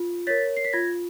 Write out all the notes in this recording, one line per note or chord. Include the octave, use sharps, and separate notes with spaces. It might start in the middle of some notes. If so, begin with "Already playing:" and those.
Already playing: F4
A#4 C#5 A6 B6
C7
B6
F4 G#6 A#6